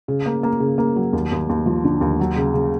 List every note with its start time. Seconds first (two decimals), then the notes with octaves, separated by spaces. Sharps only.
0.08 C#3
0.26 A#3
0.43 A#3
0.60 C#3
0.78 A#3
0.96 F#3
1.13 D#2
1.32 D#2
1.49 D#2
1.66 F3
1.84 D3
2.01 D#2
2.20 F#3
2.36 C#3
2.54 C#3